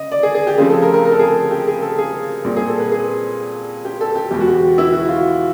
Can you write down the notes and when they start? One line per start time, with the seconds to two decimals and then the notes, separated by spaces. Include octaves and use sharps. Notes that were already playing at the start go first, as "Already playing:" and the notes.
Already playing: C#3 D#5
0.12 D5
0.23 G#4
0.35 G#4
0.47 G4
0.58 C#3 F3 A3 C4 G#4
0.70 A4
0.82 A#4
0.94 A#4
1.05 A#4
1.12 A4
1.19 G#4
1.28 A4
1.51 G4
1.67 G#4
1.82 A4
1.98 G#4
2.44 A#2 G3 C4
2.57 G#4
2.68 A4
2.79 B4
2.92 G#4
3.85 G4
4.01 A4
4.15 G4
4.31 E2 B2 G#3 G4
4.40 F#4
4.48 G4
4.78 E4
4.93 F#4
5.08 F4